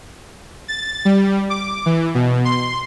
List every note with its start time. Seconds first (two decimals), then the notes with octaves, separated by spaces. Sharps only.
0.68 A6
1.05 G3
1.50 D6
1.86 E3
2.15 B2
2.45 C6